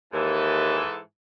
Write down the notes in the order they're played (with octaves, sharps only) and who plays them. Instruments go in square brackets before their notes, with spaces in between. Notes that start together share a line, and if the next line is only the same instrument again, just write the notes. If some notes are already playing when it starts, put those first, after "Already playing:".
[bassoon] D#2 [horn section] G#2 E3 A4